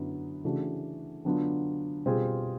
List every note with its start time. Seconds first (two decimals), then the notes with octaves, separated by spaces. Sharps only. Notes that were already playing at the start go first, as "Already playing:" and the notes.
Already playing: F#2 D3 F#3 B3 E4
0.44 C#3 E3 A3 D4 F#4
1.25 D3 F#3 B3 D4 F4
2.06 B2 G3 C4 F4 G#4